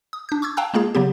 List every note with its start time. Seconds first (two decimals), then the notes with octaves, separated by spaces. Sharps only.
0.13 D#6
0.29 D4 G6
0.42 C#6 D6 E6 G#6
0.57 F5 G5 A5 A#5 E6 F#6
0.74 G#3 A#3 F4 G#4
0.95 C#3 F#3 B3 G4